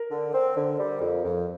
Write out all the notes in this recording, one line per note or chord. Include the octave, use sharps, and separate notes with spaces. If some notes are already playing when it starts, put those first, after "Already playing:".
Already playing: A#4
D3
C4
D3
G3
F2
F2